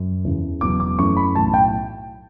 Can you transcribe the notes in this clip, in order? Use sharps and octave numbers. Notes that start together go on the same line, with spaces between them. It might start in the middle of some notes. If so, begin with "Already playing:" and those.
Already playing: F#2
E2 C#3 E3
E1 E2 B2 F#3 D6
D6
F#2 E3 A3 C#4 C#6
B5
B1 A2 E3 A5
G5